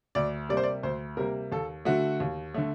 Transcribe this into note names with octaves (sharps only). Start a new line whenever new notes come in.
D2 D5
C3 G3 A#3 D5
C5
D5
D2 C5
C3 G3 A#3 A#4
D#2 A4
D3 A3 F#4
D#2
D3 A3